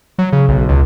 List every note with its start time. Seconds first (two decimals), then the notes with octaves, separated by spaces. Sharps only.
0.19 F#3
0.32 C#3
0.49 B1
0.69 C#2